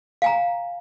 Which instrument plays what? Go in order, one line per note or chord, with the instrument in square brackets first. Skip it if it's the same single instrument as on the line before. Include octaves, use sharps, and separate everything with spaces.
[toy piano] F5 G#5 A#5